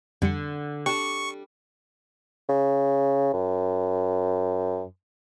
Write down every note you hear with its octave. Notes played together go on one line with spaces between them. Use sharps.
F2 D3 G3 C#7
G3 D4 G4 C#6
C#3
F#2